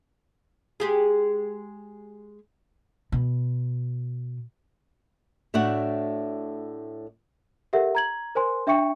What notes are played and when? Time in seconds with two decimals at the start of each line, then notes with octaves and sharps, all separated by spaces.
0.80 G#3 G4 G#4
3.12 B2
5.54 A2 A3 D4 F#4 D5 F#5
7.73 G4 A4 A#4 E5 F#5
7.95 A#5 G#6 F#7
8.35 A#4 C5 G#5 C6
8.67 D4 E5 G5 C#6 C#7